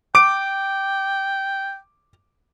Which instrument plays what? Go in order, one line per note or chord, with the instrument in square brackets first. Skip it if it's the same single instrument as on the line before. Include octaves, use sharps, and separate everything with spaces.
[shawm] G5 [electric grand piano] D6 D7